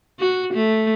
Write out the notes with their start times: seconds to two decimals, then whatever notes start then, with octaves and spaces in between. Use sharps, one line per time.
0.20 F#4
0.54 A3